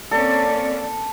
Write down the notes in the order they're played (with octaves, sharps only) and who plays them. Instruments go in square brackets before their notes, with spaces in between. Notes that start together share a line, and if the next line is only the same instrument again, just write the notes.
[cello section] A#3 C4 C#4 [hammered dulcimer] A4 [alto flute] D5